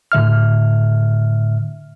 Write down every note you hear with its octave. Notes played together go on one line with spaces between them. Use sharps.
A2 D3 E5 F6